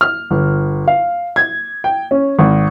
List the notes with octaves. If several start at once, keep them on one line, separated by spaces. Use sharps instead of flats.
F6
G1
F5
G#6
G5
C#4
G#1